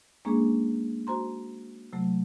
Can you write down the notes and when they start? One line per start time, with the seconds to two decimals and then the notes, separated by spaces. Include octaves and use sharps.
0.25 G#3 A#3 C#4 D4 G#4
1.07 F#4 C5 A#5 C6
1.93 C3 F#3 A3